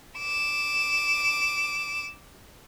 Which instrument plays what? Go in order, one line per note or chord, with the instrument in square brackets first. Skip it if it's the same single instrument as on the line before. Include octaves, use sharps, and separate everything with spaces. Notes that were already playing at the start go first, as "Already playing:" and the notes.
[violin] D6 E7